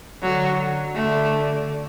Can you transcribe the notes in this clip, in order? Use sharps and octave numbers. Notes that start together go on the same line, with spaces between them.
D3 F#3
D3 A3